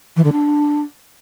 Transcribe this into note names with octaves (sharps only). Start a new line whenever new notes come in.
E3
D3
D4